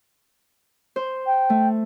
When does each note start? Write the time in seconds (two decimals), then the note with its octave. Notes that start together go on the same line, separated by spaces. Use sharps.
0.96 C5
1.26 G5
1.50 A3